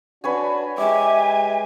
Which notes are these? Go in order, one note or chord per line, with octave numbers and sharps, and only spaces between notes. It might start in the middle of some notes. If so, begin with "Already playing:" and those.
D4 F#4 B4 C#5 G#5
G#3 G4 E5 G#5 D6